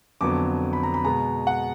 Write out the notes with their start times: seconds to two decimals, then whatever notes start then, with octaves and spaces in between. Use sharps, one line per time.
0.21 F2 D3 F#3 B3 D6
0.73 B5
0.83 A#5
0.94 B5
1.05 B2 G#3 B3 A#5
1.47 F#5